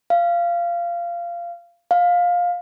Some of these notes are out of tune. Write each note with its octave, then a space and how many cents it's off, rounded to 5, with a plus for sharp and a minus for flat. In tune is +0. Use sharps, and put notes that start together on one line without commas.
F5 -20
F5 +15